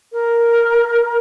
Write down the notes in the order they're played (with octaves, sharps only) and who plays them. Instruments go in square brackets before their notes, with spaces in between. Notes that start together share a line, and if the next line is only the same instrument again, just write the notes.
[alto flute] A#4